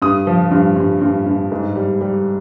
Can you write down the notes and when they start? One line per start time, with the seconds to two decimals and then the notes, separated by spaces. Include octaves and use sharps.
0.02 G2 D#6
0.27 F3
0.51 G2
0.76 G2
1.02 G2
1.26 G2
1.52 G#2
1.76 G3
2.01 G3